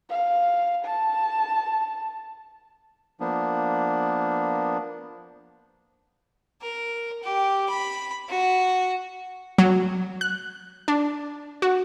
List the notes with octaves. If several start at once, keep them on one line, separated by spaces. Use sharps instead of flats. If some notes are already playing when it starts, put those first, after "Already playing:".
F5
A5
F3 A#3 B3 D4
A#4
G4
B5
F#4
F#3
F#6
D4
F#4